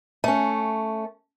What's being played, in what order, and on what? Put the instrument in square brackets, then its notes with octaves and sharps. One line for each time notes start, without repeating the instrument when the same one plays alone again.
[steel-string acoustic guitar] A3 C#4